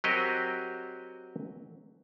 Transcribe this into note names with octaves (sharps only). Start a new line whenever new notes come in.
F#3 C4 F#4 G4 A#4 D#5